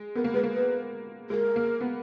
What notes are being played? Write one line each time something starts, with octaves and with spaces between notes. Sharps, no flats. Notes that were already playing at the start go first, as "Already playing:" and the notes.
Already playing: G#3
B3 A#4
A#3
G#3 B4
A#3
B4
G#3 A#4
A#3
B3